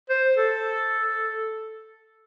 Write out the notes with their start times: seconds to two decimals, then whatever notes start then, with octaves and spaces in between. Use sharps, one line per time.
0.10 C5
0.37 A4